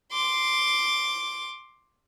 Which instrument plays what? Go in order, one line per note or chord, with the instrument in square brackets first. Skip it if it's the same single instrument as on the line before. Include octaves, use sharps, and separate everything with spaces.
[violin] C6 D6